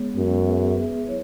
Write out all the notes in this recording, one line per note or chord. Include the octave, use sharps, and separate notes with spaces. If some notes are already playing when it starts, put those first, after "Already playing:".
Already playing: G#3 B3 G#4 C#5
F#2
B3 G#4 B4 E5
F#3 E4 C#5